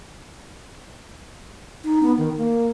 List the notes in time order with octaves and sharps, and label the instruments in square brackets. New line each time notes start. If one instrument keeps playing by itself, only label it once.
[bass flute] D#4
B3
D#3
A#3